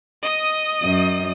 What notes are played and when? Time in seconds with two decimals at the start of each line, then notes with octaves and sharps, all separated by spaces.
0.23 D#5 D#6
0.83 F#2